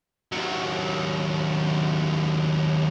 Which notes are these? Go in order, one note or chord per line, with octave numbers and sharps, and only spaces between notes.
D#2 F#3